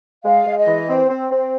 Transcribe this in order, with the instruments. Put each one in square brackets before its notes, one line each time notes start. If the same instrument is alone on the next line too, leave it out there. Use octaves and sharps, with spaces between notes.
[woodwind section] G#3 [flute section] F5
[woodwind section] G#3
[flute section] D#5
[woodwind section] E3
C4
C4
C4